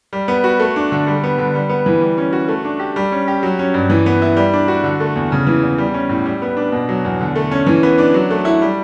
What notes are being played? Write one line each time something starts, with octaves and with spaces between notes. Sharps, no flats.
G3
B3
F#4
A3
D4
D3
G3
B3
D3
G3
B3
E3
G3
C#4
F#4
A3
D4
G4
G3
C#4
G4
F#3
C#4
G2
E3
B3
E4
G3
D4
F#4
D3
A3
E2
C#3
E3
E2
G3
C#4
A2
G3
B3
D4
B2
F#3
E2
D3
A3
C#4
E3
B3
D4
F#3
A3
E4
G3